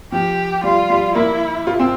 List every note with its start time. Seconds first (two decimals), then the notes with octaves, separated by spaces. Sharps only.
0.12 F3 G4
0.63 G3 F4
0.90 G3
1.15 A#3 E4
1.67 F4
1.79 C4